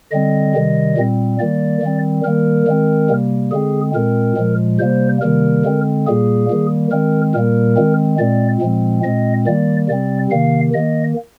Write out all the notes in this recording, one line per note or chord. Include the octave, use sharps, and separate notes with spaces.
D3 G3 C4 D#5
C3 D#3 G3
A#2 G3 C4
D#3 G3 A#3 D5
D#3 G3 C4
D#3 G3 A#3 A#4
D#3 G#3 C4
C3 G3 A#3
D3 G#3 C4 G#4
A#2 G#3 C4 A#4
A#2 F3 G#3
C3 G3 A#3 C5
C3 D#3 G3 A#3 A#4
D3 G#3 C4
A#2 G3 A#3 G#4
D#3 G3 A#3
D#3 G#3 C4 A#4
A#2 G3 A#3 A#4
D#3 G#3 C4
A#2 G#3 C4 D5
A#2 F3 G#3 C4
A#2 G#3 C4 D#5
D#3 G3 A#3 D5
C3 G3 C4 D5
C3 D#3 A#3 F5
D#3 A#3 D#5